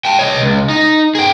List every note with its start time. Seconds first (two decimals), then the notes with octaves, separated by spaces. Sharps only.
0.05 G5 A5
0.19 C#5 D#5
0.42 C#2
0.70 D#4
1.15 G#4 G5